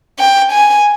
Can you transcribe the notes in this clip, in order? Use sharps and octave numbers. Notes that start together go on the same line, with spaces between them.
G5
G#5